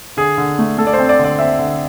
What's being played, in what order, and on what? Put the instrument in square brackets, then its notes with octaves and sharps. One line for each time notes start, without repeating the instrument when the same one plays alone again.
[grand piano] D3 G#4
D3
A3
A3 A4
D5
C5
C4
D5
D3
D5
C4 E5
D3